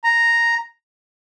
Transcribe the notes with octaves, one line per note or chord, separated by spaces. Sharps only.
A#5